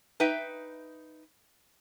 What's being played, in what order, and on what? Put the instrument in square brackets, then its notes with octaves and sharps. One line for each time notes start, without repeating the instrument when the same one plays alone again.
[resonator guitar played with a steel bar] D#4 B4 E5 G5